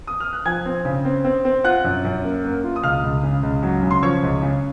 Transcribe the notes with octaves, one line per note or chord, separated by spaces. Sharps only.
D#6
F6
F#6
F3 G#5 G#6
C4
C#3
C4
C4
C4
F4 F#5 F#6
F#2
F#2
A#3
A#3
F4
D#6
C#2 F5 F6
C#2
C#3
C#2
F#3
C#3
C6
F3 C#5 C#6
C#2
C#3